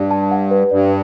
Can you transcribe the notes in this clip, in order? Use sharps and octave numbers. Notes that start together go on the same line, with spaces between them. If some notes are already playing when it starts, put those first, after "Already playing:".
Already playing: G2 D5
A5
F#5
B4
G2 D5